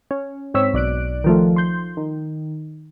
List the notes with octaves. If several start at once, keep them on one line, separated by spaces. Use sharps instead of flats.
C#4
G#2 C4 C#5 E6 B6
B1 D5 F#6 D7
D#3 F3 A3
C6 G6
D#3